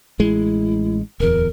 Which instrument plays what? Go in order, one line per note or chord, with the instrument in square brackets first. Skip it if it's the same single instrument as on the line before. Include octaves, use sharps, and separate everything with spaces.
[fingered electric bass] A1 G#3 [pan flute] E4
[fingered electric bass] D1 E2 [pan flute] A#4